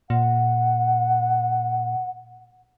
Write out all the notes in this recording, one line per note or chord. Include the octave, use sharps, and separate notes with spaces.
A#2 F#5